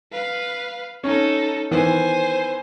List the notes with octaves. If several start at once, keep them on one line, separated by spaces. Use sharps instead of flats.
B4 F5
C#4 D#4 A4
D#3 E3 B3 C5 G#5